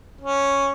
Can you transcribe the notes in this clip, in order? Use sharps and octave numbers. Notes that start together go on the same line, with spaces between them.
C#4